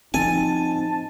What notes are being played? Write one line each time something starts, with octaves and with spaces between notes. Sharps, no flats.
F3 C4 D#4 G#5 A5